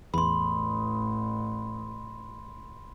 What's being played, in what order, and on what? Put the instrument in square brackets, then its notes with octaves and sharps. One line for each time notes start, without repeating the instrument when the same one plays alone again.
[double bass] A1 [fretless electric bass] E2 [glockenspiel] B5 C6